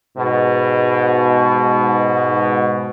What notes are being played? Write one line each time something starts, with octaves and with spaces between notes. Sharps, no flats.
G#2 B2